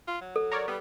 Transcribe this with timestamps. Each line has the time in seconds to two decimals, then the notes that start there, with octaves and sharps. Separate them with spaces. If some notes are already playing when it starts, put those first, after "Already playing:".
0.07 F4
0.21 F#3
0.36 A4
0.52 A#4 C#5 D5
0.68 G3 B3